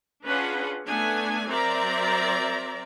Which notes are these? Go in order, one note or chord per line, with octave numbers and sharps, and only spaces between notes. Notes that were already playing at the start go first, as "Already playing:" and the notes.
C#4 D4 F4 G#4 B4 F#5
A3 B3 D4 G#5
F#3 C4 A#4 D5 E5 A#5